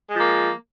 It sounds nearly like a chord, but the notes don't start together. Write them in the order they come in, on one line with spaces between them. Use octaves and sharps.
G#3 F3 A#3